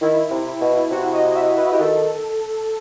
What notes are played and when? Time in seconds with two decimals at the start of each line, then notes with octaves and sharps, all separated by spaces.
0.01 D#3 E4
0.31 C3
0.61 B2
0.90 C3 F#4
1.13 D#5
1.34 E5
1.57 B4
1.72 G4
1.79 D#3 A4